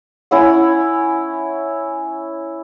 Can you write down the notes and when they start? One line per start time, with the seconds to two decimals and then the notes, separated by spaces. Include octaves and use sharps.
0.31 C#4 E4 C#5 F#5